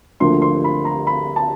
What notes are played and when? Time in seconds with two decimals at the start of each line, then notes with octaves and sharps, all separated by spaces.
0.20 D2 D3 F3 A#3 C6
0.42 C6
0.64 B5
0.85 A#5
1.07 B5
1.36 A5